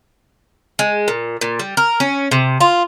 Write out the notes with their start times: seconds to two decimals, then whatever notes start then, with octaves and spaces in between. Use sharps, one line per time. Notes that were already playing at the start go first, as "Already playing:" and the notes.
0.79 G#3
1.08 A#2
1.41 A#2
1.59 G3
1.77 A#4
2.00 C#4
2.31 C3
2.60 F4